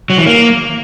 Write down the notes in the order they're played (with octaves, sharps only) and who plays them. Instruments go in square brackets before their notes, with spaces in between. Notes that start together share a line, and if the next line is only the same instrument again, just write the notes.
[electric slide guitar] F#3
E3
A#3